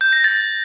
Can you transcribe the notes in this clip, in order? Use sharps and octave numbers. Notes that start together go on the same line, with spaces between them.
G6
A#6
A6